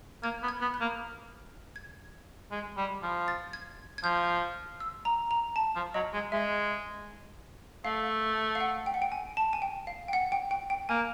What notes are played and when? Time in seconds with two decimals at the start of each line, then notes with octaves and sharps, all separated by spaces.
0.23 A#3 G#6
0.43 B3
0.48 G#6
0.61 B3
0.74 F#6
0.81 A#3
1.76 G#6
2.51 G#3
2.77 G3
3.03 F3
3.28 A6
3.53 G#6
3.98 G#6
4.04 F3 G6
4.80 E6
5.05 A#5
5.31 A#5
5.56 A5
5.76 F3
5.94 F#3 D#5
6.13 G#3
6.32 G#3 E5
7.84 A3 F5
8.55 F5
8.61 F#5
8.86 G5
8.94 F#5
9.02 G5
9.12 G#5
9.37 A5
9.53 G#5
9.62 G5
9.87 F5
10.08 G5
10.13 F#5
10.32 G5
10.51 G5
10.70 G5
10.89 A#3 G#5